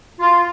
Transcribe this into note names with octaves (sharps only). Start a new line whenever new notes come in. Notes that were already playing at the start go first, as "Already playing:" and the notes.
F4